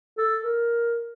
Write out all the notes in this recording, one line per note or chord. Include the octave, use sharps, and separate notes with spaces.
A4
A#4